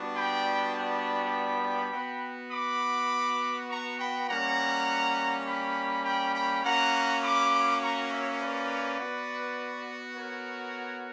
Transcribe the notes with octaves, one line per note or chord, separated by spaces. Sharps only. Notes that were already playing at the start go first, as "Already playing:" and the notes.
Already playing: G3 B3 D4 F#4
G5 B5
G5 B5
B3 F#4
B5 D6
A#5 C#6
G5 B5
G3 A#3 C#4 F#5 A#5
G5 B5
G5 B5
G5 B5
A#3 C#4 F#4 F#5 A#5
B5 D6
A#5 C#6
C#5 E5
B4 D5
B3 F#4
A#4 C#5